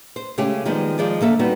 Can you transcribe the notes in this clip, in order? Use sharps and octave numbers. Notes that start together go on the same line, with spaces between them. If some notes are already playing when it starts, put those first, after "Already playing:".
C5
C#3 G#3 A3 C#4 G4
D#3 F3 G3 G#3 B3
D#3 F3 G#3 D5
D3 A#3 A4 E5
G3 B3 C4 D#4 F#4